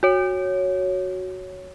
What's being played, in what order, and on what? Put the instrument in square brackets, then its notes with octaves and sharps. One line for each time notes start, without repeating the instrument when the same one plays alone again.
[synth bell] F#4 C#5